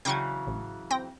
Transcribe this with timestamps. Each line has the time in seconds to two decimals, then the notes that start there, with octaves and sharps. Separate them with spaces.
0.05 C#3 E3 F#3 G5 C#6 G#6
0.47 A1
0.91 C4 G5 A#6